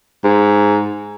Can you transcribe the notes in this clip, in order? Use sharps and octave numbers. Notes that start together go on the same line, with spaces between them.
G#2